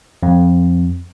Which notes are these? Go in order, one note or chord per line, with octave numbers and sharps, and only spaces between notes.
F2